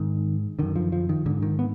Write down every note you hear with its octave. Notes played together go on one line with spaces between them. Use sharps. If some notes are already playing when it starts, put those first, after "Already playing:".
Already playing: G#2 D#3
F#2 D3 D#3
F3
F3
D#3
G#2 D3
D#3
B3